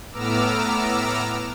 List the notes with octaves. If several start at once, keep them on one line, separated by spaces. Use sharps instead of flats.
A2 B3 A#5 D6 E6 F6